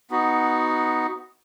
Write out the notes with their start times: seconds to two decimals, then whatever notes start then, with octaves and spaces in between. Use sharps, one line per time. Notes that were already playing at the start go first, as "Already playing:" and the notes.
0.10 B3 D#4 F#4